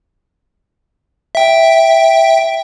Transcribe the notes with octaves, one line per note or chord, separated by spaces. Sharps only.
E5 G5